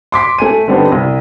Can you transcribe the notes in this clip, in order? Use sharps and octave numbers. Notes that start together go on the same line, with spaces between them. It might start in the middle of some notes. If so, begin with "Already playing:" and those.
C6 D6 B6
A3 G#5 D#7
D3 G3 B3 C4 D#4 G4
C2